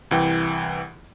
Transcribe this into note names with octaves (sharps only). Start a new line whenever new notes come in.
C2 E3 G5